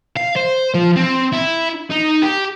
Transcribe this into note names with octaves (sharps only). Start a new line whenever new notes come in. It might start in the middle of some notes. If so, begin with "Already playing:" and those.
F5
C5
F3
C4
E4
D#4
G4